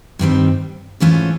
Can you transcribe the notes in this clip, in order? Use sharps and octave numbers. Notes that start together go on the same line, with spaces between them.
G2 D#3 G3 C4
G#2 E3 A3 C#4 F4